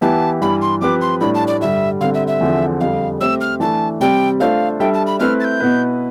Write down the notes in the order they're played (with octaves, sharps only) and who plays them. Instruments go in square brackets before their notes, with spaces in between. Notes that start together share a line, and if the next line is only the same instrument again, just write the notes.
[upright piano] E3 B3 E4 G4 B4 [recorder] A5
[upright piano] G2 E3 G3 [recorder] B5
[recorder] C6
[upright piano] F3 C4 G4 B4 [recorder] D6
[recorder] C6
[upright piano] A2 G3 D4 [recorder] B5
[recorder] A5
D5
[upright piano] G2 D3 G3 [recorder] E5
[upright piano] D3 G3 C4 [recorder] F5
[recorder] E5
E5
[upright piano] E2 D3 F3 C4
[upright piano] F2 D3 G3 [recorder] F5
[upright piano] A3 C4 G4 C5 E5 [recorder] E6
[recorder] F6
[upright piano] E3 A3 D4 [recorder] A5
[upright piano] C3 G3 C4 G4 D5 [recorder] G5
[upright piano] A3 D4 F4 A4 C5 [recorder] F5
[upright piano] G3 D4 A4 E5 [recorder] G5
[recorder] A5
B5
[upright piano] A3 C4 E4 B4 E5 [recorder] F6
[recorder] A6
G6
[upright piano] B2 B3 E4 B4